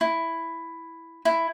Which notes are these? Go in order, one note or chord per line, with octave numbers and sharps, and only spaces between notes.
E4
E4